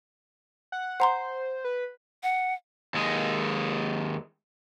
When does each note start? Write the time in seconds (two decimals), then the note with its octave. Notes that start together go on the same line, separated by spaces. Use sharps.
0.72 F#5
1.00 C5 F#5 A#5 C6
1.64 B4
2.23 F#5
2.94 D#2 G#3